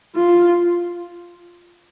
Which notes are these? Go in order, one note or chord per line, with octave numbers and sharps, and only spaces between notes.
F4